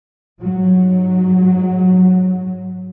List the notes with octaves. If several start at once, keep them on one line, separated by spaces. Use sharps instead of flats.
G#2 F#3